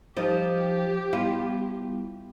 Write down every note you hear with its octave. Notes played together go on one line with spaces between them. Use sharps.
F3 D#4 G4
G3 B3 E4 F4